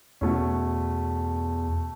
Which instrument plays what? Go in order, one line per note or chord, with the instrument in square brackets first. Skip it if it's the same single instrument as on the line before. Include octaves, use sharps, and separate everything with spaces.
[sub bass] E2 [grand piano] B2 A3 C#4